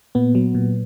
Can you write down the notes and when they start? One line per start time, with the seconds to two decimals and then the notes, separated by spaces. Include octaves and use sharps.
0.15 A#2 B3
0.35 F#3
0.55 A#2